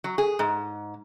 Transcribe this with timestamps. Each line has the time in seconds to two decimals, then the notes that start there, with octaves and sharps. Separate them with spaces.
0.04 F#3
0.18 G#4
0.39 G#2